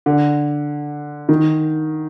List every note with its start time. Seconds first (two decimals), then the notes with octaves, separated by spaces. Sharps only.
0.06 D3
1.29 D#3